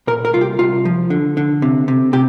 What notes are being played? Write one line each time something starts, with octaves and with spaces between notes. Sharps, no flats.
A#2 A#4
A#4
C2 F4
G4
C2 F4
F3
D3
D3
C3
C3
C3 G4